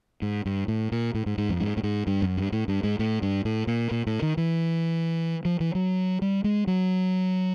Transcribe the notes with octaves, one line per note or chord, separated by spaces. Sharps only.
G#2
G2
A2
A#2
A2
G#2
G#2
F2
G#2
A2
G#2
G2
F#2
G2
A2
G2
G#2
A2
G2
A2
A#2
A#2
A2
D#3
E3
F3
E3
F#3
G3
G#3
F#3